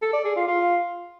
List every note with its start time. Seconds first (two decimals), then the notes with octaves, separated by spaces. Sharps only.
0.02 A4
0.13 D5
0.25 G#4
0.36 F4
0.47 F4